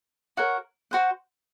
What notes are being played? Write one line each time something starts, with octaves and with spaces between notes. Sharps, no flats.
F#4 A#4 C#5 F#5
F#4 C5 F#5